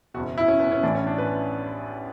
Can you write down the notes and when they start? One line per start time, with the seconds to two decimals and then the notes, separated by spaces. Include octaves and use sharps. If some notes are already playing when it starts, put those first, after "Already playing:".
0.14 F#1 E2 B2 F#4
0.38 E4
0.48 C#4
0.60 B3
0.72 C#4
0.83 A1 A2 E3 D4
0.95 C#4
1.07 D4
1.18 B4